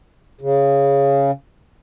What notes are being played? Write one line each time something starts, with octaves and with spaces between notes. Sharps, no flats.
C#3